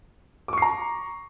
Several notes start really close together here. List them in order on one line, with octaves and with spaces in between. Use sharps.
D6 C#6 C7 A#5